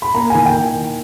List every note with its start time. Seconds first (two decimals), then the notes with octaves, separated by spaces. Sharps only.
0.02 B5
0.14 A#3 A#5
0.30 D#3 G#5
0.46 G5